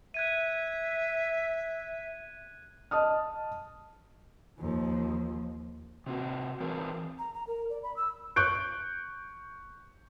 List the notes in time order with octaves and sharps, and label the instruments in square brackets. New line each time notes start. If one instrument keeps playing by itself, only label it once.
[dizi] E5 [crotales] F#6 G#6 D#7
[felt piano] D#5 A5 D#6 F6
[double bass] D#2 F3
[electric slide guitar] C3 C4 F#4
E3 C4 G#4 A#4
[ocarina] A#5
A#5
A#4
D5
B5
E6
[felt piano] C#6 F#6 G6 D7